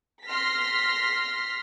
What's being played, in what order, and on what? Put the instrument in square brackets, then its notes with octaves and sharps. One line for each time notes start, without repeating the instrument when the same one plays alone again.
[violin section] C6 F6 A#6 B6